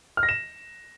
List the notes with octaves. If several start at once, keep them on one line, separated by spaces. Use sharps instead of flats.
F6
A#6
E7